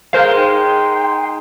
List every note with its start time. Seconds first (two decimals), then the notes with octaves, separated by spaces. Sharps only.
0.13 G#3 A#4 C5 F5
0.36 D#4 G5 C6